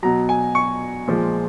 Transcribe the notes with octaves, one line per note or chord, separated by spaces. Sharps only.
B2 F#3 A#5
G#5
C#6
A#2 F3 G#3